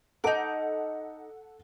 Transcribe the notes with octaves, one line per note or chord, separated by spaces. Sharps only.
D#4 A4 F#5 A5 D6